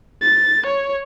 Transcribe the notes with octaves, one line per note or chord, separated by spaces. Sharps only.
A6
C#5